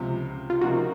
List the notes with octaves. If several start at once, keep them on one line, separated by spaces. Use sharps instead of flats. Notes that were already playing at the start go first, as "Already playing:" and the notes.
Already playing: C#2 C3 F3
F4
C3 F3 A#3 D#4 F#4